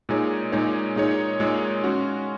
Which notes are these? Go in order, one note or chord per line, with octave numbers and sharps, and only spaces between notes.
A#2 G#3 D#4 G#4 C#5
A#2 G#3 D#4 G#4 C#5
A#2 G#3 D#4 G#4 C#5
A#2 G#3 D#4 G#4 C#5
G#3 C#4 F#4